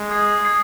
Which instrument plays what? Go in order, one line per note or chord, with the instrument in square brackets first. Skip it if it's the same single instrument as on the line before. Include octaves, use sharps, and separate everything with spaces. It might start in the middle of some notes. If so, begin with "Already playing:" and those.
Already playing: [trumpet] G#3
[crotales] D#6 G#6 C7
G#6 C7